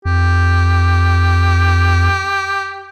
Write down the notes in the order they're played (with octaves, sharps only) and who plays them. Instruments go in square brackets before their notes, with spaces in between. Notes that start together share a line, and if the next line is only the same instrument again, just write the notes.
[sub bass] F2 [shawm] G4